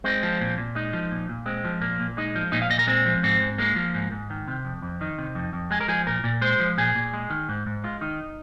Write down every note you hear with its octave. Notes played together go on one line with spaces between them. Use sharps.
G#3 C4
F3
A#2
A#2
G#3 D#4
F3
A#2
A#2
G#3 C4
F3
A#2 A#3
A#2
G#3 D#4
F3
A#2 D#4
F5
A#2 D#5
A#4
G#3 C4
F3
G#2 C4
G#2
G#3 A#3
F3
G#2
G#2
D#3
C3
F2
F2
D#3 D#4
C3
F2
F2
G#3 G#4
A#4
F3 G#4
A#2 A#4
A#2
G#3 C5
F3
A#2 G#4
A#2
G#3
D#3
G#2
G#2
G#3 F4
D#3 D#4